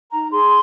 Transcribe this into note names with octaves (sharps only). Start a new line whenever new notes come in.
D#4 A#5
G#4 C6